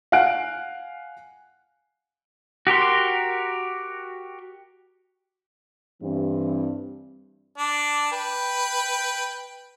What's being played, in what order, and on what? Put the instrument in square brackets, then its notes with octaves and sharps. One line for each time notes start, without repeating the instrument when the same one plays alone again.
[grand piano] F5 F#5 G#5 F#6 D7
[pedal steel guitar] F#4 G4 A#4 C6
[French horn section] G2 E3 C4
[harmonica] D4
B4 G5